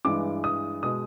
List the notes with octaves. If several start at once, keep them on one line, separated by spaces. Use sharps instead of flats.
G2 E3 G#3 D6
D#6
B2 G#3 D#6